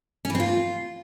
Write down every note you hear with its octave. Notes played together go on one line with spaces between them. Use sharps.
C#4
E3
C4
F4